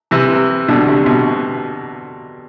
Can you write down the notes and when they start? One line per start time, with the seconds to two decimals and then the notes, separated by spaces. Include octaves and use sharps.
0.11 C3 E3
0.68 B2 D3
0.87 C3
1.06 B2